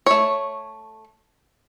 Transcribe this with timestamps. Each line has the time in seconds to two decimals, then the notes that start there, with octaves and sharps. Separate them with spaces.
0.06 A3 C#5